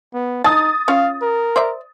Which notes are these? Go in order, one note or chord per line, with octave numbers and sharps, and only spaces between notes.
B3
D#4 A5 D#6 A6
C#4 F4 F5
A#4
C5 D5 E5